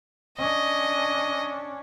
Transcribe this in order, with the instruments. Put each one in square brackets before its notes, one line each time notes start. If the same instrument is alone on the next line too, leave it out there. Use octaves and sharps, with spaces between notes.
[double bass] C#4 D4 [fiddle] D#5